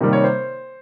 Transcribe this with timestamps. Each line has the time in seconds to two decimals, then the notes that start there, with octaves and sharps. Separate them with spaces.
0.01 C3 D#3 G3 A#3
0.13 C#5
0.24 C5